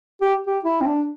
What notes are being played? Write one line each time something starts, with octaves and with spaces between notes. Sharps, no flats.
G4
G4
E4
C4
D4